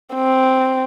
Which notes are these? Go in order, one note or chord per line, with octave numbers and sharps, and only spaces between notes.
C4